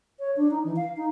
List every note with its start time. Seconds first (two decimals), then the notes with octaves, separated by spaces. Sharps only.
0.19 C#5
0.36 D4
0.51 D#4
0.64 E3
0.76 F5
0.97 D#4